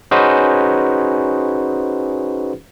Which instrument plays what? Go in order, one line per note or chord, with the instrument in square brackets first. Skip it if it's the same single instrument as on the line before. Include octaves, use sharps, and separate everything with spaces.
[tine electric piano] C#4 D#4 F#4 G#4 B4 C5